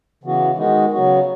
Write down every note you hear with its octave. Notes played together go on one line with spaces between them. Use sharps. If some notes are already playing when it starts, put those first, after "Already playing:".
C#3 E3 B3 F#4
D#3 G#3 B3 D#4 F#4
C#3 F#3 B3 F#4